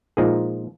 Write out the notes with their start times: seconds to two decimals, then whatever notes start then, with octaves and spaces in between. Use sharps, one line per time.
0.17 A#2 F3 G#3 D#4 G#4